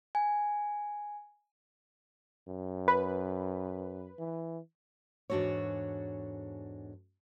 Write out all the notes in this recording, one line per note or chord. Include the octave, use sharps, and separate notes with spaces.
G#5
F#2
B4
E3
E2 G#2 D4 F#4 A4 C#5